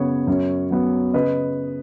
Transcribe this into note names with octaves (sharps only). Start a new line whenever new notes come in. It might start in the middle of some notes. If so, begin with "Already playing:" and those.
Already playing: F#2 C#3 B3 C#5
F#2
F#3 B3
C#3 B4 D#5